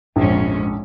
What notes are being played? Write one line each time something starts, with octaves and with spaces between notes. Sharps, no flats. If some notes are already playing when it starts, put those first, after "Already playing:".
A#1 F2 G#2 C#4